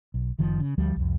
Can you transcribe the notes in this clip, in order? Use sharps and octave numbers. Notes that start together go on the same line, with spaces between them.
B1
F#1 D#3 F3
C#3
D2 F3 G3
C2 F2